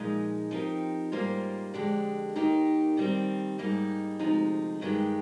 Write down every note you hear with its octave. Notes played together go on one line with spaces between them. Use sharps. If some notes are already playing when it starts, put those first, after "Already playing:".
Already playing: A#2 F3 G#3 D#4 G#4
F3 C4 D#4 G4 A#4
G#2 G3 A#3 F4 C5
F2 D3 G#3 D4 G4
D#2 D#3 A#3 D#4 G4
D#3 G3 C4
G#2 G3 A#3 D#4 G#4
D2 C3 F3 G#3 D#4
G2 D#3 G#3 D4 G4